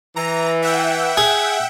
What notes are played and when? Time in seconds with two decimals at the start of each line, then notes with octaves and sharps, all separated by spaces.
0.16 E3 A#5
0.62 E5 F#5 G5
1.17 G#4